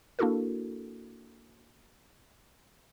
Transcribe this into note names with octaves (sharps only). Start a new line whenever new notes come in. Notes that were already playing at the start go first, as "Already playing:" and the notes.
A#3 D4 E4 F#4 A4 A#4